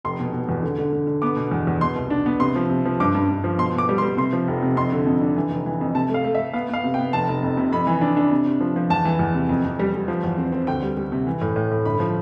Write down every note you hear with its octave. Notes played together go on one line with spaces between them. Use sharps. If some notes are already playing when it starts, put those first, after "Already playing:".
F1 C6
B2
B2
E2
D3
D3
D3
D3
B3 D6
B2
E2
E2
B2 C6
C2
D4
B3
C3 C6
F3
C3
F3
G2 D6
G2
G2
F3
B2 C6
B2
D6
G3
C6
G3
C3 C6
F3
F1
C3
F2 C6
D3
F2
D4
E3
F1
E3
F2
C3 A5
A3 F5
A3
E5
A3
B3 F5
B3 F5
C3
G5
B3
F1 A5
F1
F2
C3
F2 B5
E3
D4
D4
C3
C3
F3
F3
E2 A5
E3
E2
C3
F2
F2
G3
G3
F3
E2
C4
C4
D2 G5
G3
G3
C3
E3
A2
A2
A2
G1 B5
F3